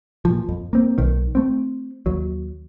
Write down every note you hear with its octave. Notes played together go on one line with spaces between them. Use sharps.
A#2 F3
F2
A#3 C4
B1 D#3
A3 C4
D#2 F#3